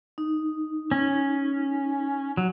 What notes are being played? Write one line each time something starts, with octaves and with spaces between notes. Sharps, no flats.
D#4
C#4
F#3